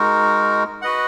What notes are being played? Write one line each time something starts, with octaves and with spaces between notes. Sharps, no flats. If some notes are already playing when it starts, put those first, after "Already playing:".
Already playing: G#3 D#4 F#4 A#4
F#4 B4 D#5 F#5